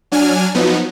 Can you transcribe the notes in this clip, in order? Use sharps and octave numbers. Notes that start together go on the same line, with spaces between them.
F#3 D4 G#5 F6
F3 F#3 B3 D#4